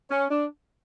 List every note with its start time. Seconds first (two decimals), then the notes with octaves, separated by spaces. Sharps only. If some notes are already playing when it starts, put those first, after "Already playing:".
0.11 C#4
0.31 D4